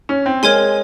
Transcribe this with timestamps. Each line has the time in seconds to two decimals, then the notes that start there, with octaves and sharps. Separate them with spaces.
0.09 C#4
0.26 C4
0.43 G#3 A#4 C#5 G#5 C6